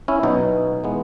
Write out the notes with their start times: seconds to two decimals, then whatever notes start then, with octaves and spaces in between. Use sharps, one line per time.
0.08 C#4 E4
0.23 B2 F#3 B3 D#4
0.84 E3 G#3 B3